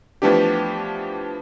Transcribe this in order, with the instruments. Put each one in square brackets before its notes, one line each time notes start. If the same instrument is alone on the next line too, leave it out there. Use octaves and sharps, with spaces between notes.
[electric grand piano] E3 F3 A3 B3 D4 G4